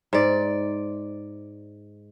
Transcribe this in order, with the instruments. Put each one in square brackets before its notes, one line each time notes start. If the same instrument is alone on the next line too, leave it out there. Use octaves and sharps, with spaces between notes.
[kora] G#2 D5